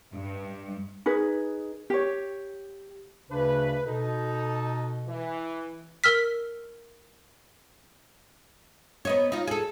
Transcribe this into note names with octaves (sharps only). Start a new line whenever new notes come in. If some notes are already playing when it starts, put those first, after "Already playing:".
G2
D#4 G#4 B4
G4 C#5
D2 C#3 D4 B4
B2 D#4 A4
E3
A#4 E6 F6 B6
B3 D#4 C#5
D#4 F4
G#4 A4